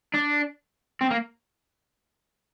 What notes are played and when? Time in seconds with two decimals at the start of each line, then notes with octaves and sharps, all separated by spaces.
0.14 D4
1.01 C4
1.11 A#3